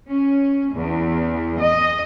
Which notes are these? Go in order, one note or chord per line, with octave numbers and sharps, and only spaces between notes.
C#4
E2
D#5